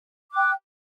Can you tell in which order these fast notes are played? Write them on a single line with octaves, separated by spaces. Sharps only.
D6 F#6 G5